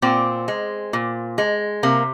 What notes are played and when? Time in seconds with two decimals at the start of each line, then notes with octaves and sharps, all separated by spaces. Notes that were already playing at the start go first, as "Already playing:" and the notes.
0.02 A#2 C4
0.48 G#3
0.93 A#2
1.38 G#3
1.83 C3 A#3